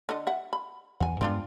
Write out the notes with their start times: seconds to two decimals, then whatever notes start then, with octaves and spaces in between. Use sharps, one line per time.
0.09 D3 A4 D#5
0.27 E5 F#5
0.53 B5
1.00 E2 F#5 G#5
1.21 G2 G#3 B3 C4 D4 F4